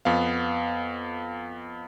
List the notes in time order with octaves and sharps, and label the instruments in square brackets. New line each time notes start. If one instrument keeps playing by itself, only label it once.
[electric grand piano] F2 B3 F5